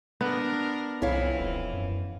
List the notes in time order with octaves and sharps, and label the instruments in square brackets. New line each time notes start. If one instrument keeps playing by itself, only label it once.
[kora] B3 [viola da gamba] D4 A#4
[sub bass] C2 [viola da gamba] F2 E3 [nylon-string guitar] E4 C#5 F5
[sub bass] D#1
F#2